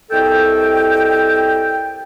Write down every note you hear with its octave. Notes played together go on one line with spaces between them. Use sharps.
C2 A4 D#5 G5